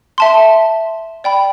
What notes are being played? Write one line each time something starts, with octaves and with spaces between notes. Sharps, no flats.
E5 A5 C6
D5 G5 B5